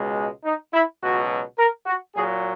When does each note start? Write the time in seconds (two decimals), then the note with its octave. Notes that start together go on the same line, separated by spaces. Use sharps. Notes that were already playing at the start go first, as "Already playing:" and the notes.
Already playing: C#2 B2 G#3
0.45 D#4
0.73 E4
1.02 C#2 B2 F#3 F#4
1.58 A#4
1.86 F#4
2.15 A#2 F#3 A#3 G#4